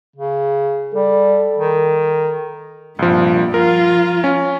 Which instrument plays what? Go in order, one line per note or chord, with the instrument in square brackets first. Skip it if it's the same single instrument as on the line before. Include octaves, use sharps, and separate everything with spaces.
[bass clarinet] C#3
[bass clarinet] G3 [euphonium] A4
[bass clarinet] D#3
[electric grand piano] C2 F3 [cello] G2 A#2
[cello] F3 F4 [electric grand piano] A#4
[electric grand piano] C#4